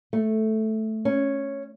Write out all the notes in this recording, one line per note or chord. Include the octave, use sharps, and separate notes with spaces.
A3
C#4